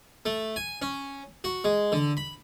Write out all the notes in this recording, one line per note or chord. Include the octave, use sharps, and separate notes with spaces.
A3
G#5
C#4
F#4
G#3
D3
B5